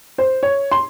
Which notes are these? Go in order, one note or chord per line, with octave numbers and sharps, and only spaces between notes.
C5
C#5
C6